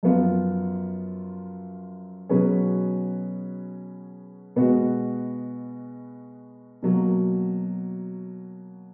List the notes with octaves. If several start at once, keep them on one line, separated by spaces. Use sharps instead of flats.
F#2 F3 B3 F4
B2 F#3 C#4 G#4 B4
B2 G#3 B3 F#4
B2 F#3 A#3